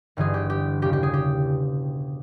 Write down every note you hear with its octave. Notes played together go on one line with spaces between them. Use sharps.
G1 G2 E3 G#4
G4
G4
E1 E2 C#3 G4
G4
G#4
G4